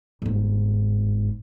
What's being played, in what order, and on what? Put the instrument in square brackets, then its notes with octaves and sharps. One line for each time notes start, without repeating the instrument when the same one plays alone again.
[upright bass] G1 G#2